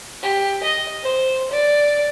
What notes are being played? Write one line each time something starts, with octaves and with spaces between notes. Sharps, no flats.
G4
D#5
C5
D5